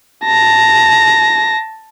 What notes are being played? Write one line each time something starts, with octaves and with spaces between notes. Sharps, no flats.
A5 A#6